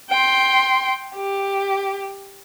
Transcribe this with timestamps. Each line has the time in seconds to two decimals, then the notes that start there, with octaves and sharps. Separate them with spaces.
0.10 G5 C6
1.14 G4